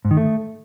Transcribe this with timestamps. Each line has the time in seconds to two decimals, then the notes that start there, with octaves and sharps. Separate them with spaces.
0.05 G#2
0.11 D#3
0.17 A3